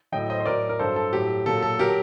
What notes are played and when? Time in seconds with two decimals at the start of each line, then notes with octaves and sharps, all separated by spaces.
0.12 A2 F#3 D#5 G5
0.30 C5 D#5
0.40 C5
0.46 A2 F#3 A#4 D5
0.69 A#4
0.79 G2 F#3 A4 C5
0.96 A4
1.13 A2 F#3 G4
1.46 A#2 F#3 A4
1.62 A4
1.79 F#3 G4 A#4